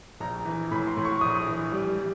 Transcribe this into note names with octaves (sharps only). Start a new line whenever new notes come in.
A#1 A#5
E3
A2 B5
C6
A2
C#6
A#1 D#6
E3
G3
G3